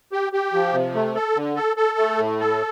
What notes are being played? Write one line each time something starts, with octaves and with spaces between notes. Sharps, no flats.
G4
G4
F3
C3
A3
A4
D3
A4
A4
A3
A2
A4